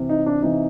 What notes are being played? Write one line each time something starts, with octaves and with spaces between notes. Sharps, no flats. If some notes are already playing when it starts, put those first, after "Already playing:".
Already playing: C3 E3
D#4
D4
C3 E3 D#4